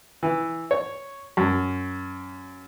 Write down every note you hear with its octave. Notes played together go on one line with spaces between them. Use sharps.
E3
C#5
F#2